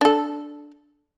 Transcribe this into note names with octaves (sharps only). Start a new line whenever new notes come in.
D4 A4